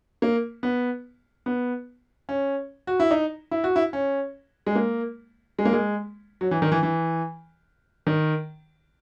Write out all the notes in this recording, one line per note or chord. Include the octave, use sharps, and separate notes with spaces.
A#3
B3
B3
C#4
F#4
E4
D#4
E4
F#4
E4
C#4
G#3
A#3
G#3
A#3
G#3
F#3
E3
D#3
E3
E3
D#3